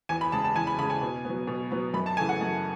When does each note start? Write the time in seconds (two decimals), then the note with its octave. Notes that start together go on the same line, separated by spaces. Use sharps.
0.09 E2 G#5
0.21 B5
0.32 C#3 G#3 A5
0.44 A5
0.55 E2 G#5
0.67 B5
0.78 C#3 B5
0.83 G#3
0.90 G#5
1.01 B2
1.25 F#3 B3
1.47 B2
1.72 F#3 B3
1.94 F#2 B5
2.06 A5
2.17 C#3 E3 A3 G#5
2.29 F#5
2.41 F#2